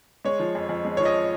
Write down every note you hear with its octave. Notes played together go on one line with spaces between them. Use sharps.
G#3 C#5
F3
F2
F2
G#3
C#5
F3
D#5